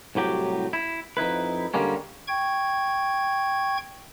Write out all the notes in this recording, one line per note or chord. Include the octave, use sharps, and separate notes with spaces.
C2 A2 F#3 G4
E4
F2 D#4 E4 B4
D3 G3 G#3 A#3 C#4
G5 C#6 G#6